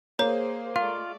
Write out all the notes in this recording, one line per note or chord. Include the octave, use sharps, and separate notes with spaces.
A#3 G#4 C5 C#5 A#5
G#3 A3 F4 D5 F5